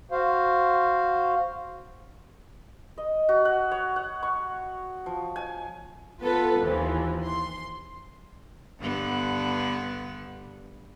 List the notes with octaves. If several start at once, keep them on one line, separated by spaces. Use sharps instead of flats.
F#4 C5 F5
D#5
F#4
F#5
C#5
F#5
C#6
F3
G#5
B3 F4 A4 B4
D#2 E3 F3
C6
G2 D3 B3